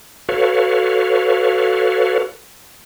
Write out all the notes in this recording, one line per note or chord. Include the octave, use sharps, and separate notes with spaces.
F#4 A4 B4 C#5 F5